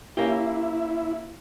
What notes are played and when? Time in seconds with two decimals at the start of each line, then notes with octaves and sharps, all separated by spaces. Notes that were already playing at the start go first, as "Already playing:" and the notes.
0.17 A#3 C#4 E4 G4